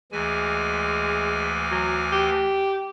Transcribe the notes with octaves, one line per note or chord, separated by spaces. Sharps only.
D2 E3 G#3 G#5
F#3
G4